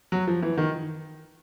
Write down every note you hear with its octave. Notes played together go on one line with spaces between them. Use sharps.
F#3
F3
E3
D#3